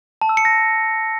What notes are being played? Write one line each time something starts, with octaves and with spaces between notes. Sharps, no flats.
A5
E6
C#7
A#6